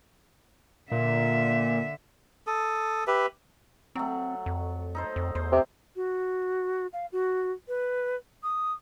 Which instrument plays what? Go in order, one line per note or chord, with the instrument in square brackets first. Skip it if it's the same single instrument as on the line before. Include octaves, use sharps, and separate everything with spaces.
[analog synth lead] A#2 [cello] D3 E5
[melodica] A4 D#6
G4 B4 E5
[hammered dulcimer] F#3 A3 [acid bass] C4
[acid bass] F2
[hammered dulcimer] D#4 A4 C5
[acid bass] F2
[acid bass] E2 [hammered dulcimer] C5
[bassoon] C3
[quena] F#4
F5
F#4
B4
D#6